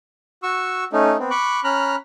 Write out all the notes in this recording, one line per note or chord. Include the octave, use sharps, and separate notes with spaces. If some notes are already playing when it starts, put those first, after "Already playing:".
F#4 C#6 E6
A3 C#4 D#4
B3 C4
B5 C#6 D6 F#6
C#4 A#5 B5 F6 F#6